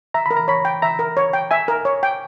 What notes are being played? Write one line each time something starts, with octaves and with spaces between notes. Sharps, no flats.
E5 A#5
A#4 B5
A#5
C#5 B5
G5
E5 A#5
A#4
C#5
G5
E5 G#5
A#4
C#5
G5